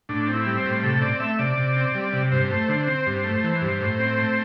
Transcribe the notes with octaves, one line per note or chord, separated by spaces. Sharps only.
A2 D4
C4
E4
G3
C5
A2
C3 A4
C4 D5
A3 E5
C3 D5
C3
C4
G3
C3
G2 C5
A3
D3
C4
G2
A3
E3
G2
A2
C4
A3